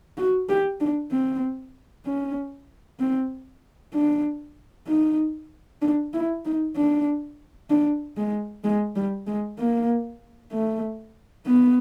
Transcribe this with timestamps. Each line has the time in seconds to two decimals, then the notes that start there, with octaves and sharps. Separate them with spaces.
0.18 F#4
0.49 G4
0.80 D4
1.12 C4
2.06 C#4
3.00 C4
3.94 D4
4.88 D#4
5.82 D4
6.14 E4
6.45 D#4
6.76 D4
7.70 D4
8.17 G#3
8.64 G#3
8.96 G3
9.27 G#3
9.59 A#3
10.52 A3
11.46 B3